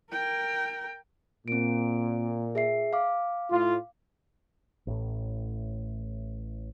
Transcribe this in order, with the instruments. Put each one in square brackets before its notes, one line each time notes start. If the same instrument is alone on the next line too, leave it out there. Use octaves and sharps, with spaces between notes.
[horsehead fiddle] A#4 G5
[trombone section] A#2 [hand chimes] C4 D7
[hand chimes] G#4 E5 C7
F5 D6
[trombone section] A2 F4
[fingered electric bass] A1 A2